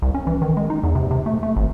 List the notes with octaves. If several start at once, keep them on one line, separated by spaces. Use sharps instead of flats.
C2
C#4
E3
D#3
G#3
D#4
E2
C3
C3
A3
A3
G#1